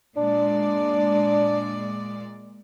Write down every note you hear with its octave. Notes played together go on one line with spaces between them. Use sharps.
A#2 G#3 D4 D5